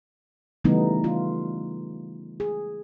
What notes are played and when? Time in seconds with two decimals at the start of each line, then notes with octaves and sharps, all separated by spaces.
0.64 C#3 E3 G3 A3 B3 D#4
1.04 F4
2.40 G#4